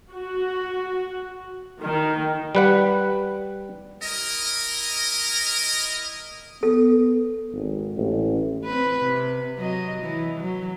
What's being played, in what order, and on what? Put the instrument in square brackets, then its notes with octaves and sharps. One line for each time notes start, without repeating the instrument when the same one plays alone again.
[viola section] F#4
D#3
[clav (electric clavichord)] G3 B4 F#5
[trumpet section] E4 A#4 D#5
[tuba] B3 [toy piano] A4
[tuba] G#1
A1
[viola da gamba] C4 B4
C3
F#3 D#5
E3
F#3